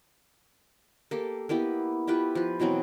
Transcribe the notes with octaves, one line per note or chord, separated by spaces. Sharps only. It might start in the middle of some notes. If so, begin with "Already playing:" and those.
A#3 G4 A4
A#3 B3 E4 G4
E4 F4 G4 B4
F3 B4
B2 E3 F#3 C4